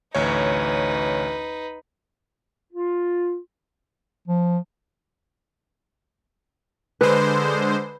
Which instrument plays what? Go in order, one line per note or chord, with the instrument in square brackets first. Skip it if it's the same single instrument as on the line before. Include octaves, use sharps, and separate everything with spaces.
[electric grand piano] A1 D2 C#5 [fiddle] D#4 B4
[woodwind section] F4
[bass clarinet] F3
[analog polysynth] D3 G#3 C5 [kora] B4